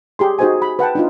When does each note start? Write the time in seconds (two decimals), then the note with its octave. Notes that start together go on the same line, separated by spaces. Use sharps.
0.19 G4 G#4 C6
0.39 D#4 F#4 G#4 C5 D#5 G#5
0.62 B5
0.79 B4 F#5 G5 A5
0.95 D4 D#4 F4